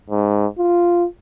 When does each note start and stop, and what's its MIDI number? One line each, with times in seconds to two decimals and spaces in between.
0.10 0.47 44
0.58 1.06 65